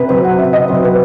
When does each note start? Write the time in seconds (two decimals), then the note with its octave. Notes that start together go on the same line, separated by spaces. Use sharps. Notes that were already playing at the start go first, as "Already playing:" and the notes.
Already playing: C3 B4
0.09 F#3 C4 C5
0.24 F#5
0.39 C3 E5
0.53 D#5
0.69 F#3 C4 C5
0.84 B4